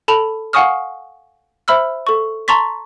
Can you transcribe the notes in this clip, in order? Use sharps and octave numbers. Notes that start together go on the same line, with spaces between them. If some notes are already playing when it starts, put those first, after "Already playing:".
A4 A5 B5 F7
F5 F#5 G#5 C#6 D#6 F6
C5 E5 B5 E6 F6
A4 C#6
A5 A#5 C6 C#6 A6 B6